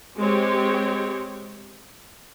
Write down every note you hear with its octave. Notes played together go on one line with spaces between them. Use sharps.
G#3 C4 G4 C#5